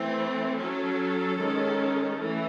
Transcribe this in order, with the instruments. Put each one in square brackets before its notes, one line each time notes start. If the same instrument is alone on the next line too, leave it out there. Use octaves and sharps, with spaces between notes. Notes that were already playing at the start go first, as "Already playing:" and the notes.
Already playing: [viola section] E3 A3 C4
F#3 C#4 A4
D#3 G#3 C#4
E3 A3